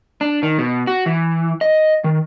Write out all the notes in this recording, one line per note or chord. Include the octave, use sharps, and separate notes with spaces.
D4
D#3
B2
F#4
E3
D#5
D#3